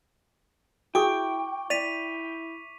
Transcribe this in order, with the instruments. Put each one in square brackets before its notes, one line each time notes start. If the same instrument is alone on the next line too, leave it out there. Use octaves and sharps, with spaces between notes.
[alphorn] E4 [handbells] F#4 G#4 [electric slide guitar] G5 [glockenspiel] C#6 D6
[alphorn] E4 [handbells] D5 [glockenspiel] B6 D#7 F7